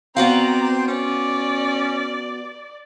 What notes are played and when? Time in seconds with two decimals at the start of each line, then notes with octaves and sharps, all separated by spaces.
0.17 B3 C4 F#4 D5 F5 A#5
0.88 C#4 D5